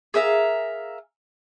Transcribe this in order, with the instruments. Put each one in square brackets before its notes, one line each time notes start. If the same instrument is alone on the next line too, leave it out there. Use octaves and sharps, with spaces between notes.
[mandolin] G#4 A#4 E5 F5